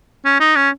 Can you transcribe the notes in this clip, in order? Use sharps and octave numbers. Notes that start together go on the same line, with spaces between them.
C#4
D#4
C#4